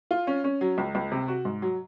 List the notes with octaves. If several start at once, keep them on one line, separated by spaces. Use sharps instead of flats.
F4
C#4
C#4
F#3
C#2
C#2
C3
F#4
G#2
F#3